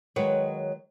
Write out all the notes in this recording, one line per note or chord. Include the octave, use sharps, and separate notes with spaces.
D#3 F#3 G#3 B4 C#5